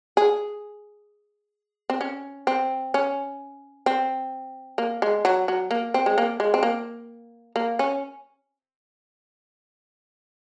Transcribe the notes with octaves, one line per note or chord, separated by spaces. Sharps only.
G#4
C4
C#4
C4
C#4
C4
A#3
G#3
F#3
F#3
A#3
C4
G#3
A#3
G#3
C4
A#3
A#3
C#4